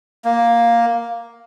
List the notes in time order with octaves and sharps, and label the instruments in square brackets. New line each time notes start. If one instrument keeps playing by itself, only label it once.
[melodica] A#3